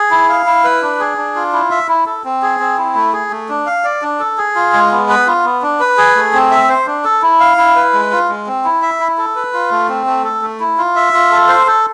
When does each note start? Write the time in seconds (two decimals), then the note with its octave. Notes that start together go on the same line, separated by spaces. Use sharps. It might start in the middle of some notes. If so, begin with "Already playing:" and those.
Already playing: G#4
0.11 E4
0.29 F5
0.46 E4
0.64 B4
0.82 D4
1.00 G#4
1.18 D4
1.36 F4
1.53 E4
1.71 E5
1.88 E4
2.06 A4
2.24 C4
2.42 G#4
2.60 C4
2.78 E4
2.95 A3
3.13 G#4
3.31 A3
3.49 D4
3.66 F5
3.84 D5
4.02 D4
4.20 A4
4.38 G#4
4.55 F4
4.73 G#3
4.91 B3
5.09 B4
5.26 F4
5.44 B3
5.62 D4
5.80 B4
5.98 G#4
6.15 A3
6.33 C4
6.51 E5
6.69 C5
6.87 D4
7.04 A4
7.22 E4
7.40 F5
7.57 E4
7.76 B4
7.93 G#3
8.11 F4
8.29 G#3
8.47 C4
8.65 E4
8.82 E5
9.00 E4
9.18 A4
9.36 B4
9.53 F4
9.71 A3
9.89 C4
10.07 A3
10.24 A4
10.42 A3
10.60 E4
10.78 F4
10.96 E5
11.13 F4
11.31 A4
11.48 C5
11.67 A4